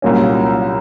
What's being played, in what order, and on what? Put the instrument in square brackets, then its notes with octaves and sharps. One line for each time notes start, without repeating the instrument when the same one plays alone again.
[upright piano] C2 A#2 F#3 A#3 C#4